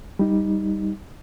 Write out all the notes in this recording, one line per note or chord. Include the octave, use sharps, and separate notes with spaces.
G3 D#4